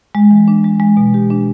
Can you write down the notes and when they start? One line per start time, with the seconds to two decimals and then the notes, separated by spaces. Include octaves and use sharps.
0.15 G#3
0.31 E3
0.48 D4
0.64 G#3
0.80 G#3
0.97 B2
1.14 G4
1.30 D4